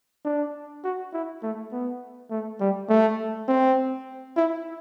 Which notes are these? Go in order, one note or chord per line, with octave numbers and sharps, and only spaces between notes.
D4
F#4
E4
A3
B3
A3
G3
A3
C4
E4